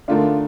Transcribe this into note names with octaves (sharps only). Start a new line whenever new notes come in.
D3 A3 D4 D#4 F4 A#4